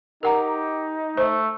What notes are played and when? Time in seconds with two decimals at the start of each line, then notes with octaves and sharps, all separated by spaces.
0.23 D#4 G4 A#4 F#5 A#5
1.17 A3 C5